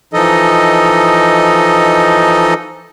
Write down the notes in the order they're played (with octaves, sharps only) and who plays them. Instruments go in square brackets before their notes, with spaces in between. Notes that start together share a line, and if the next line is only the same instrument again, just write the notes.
[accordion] E3 F3 D#4 A4 D#5